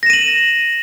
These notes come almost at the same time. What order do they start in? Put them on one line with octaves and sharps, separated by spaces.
A#6 E7 D#7 F#7